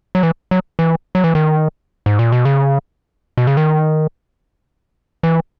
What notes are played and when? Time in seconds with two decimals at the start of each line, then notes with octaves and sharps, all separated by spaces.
0.15 F#3
0.23 E3
0.51 F#3
0.79 E3
1.15 F#3
1.24 E3
1.35 D#3
2.06 G#2
2.19 A#2
2.32 B2
2.45 C#3
3.38 B2
3.47 C#3
3.57 D#3
5.23 E3